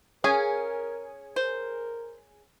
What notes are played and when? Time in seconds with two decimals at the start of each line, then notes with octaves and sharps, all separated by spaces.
0.24 C#4 G#4 A#4 F5 G#5
1.36 A#4 C5